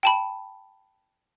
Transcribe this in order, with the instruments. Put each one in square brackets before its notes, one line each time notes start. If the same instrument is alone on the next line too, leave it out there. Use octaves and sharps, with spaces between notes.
[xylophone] G5 A5 B5